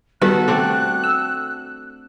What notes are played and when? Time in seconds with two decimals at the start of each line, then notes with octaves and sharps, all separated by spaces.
0.22 D#3 G3 B3 F#4 A4 F#6
0.48 A3 C4 D4
1.04 E6